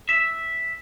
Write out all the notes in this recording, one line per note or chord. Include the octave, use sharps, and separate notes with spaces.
E5